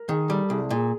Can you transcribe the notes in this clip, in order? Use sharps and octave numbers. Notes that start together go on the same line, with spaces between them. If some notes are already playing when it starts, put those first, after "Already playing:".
Already playing: A#4
D#3 G#4
G3 A4
C2 G#4
A#2 G#4